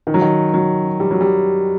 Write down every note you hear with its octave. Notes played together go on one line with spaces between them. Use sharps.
D#3
F#3
D#3
F#3
G3
F#3
G3